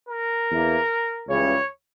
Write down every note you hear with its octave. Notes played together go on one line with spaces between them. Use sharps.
A#4
E2 E3 A#3
C#2 C#3 E3 G3 C#5